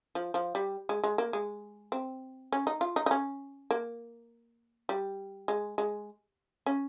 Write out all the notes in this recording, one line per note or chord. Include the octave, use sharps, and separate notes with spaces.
F3
F3
G3
G#3
G#3
A#3
G#3
C4
C#4
D#4
F4
D#4
D#4
C#4
A#3
G3
G#3
G#3
C#4